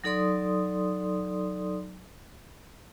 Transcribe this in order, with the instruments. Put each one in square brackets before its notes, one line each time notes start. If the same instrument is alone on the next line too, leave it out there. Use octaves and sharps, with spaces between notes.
[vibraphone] F#3 D#4 A4 D5 C6 D#6